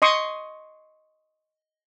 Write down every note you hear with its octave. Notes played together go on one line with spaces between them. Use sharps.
D#5 C6 C#6 D#6